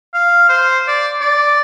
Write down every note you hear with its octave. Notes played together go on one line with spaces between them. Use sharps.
F5
C5
D5
D5